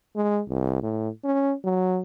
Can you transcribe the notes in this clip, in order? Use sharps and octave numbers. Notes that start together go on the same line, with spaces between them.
G#3
C2
A2
C#4
F#3